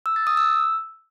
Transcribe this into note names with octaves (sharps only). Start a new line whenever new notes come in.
E6
A6
D#6
E6